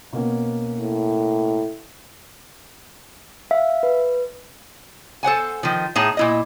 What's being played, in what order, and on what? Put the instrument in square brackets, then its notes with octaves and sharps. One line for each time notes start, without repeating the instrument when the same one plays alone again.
[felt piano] B2 A#3 C#4
[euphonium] A2
[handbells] E5 [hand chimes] F5
[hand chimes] B4
[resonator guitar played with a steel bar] A4 C5 F#5 G#5
D#3 F3
A2 D#4 G#4 A5 A#5
A#2 E4 D#5